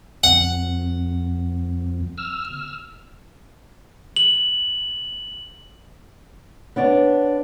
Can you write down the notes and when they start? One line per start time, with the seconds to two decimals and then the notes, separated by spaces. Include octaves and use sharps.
0.24 F2 F#5
2.18 E6 F6
4.16 F#7
6.76 B3 D4 C#5 D5